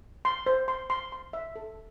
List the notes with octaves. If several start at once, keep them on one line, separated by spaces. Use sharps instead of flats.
C6
C5
C6
C6
C6
E5
A4